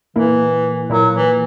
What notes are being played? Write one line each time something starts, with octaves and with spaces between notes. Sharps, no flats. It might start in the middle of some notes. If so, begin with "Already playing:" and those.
A#2 E3 A#3 E4
A#2 F#3 A#3 E4
E3